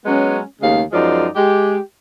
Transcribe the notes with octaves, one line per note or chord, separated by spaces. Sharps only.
F#3 G#3 B3 C#4
D#2 C#3 G#3 A3 F5
F#2 F3 G#3 D#4 D5
G#3 G4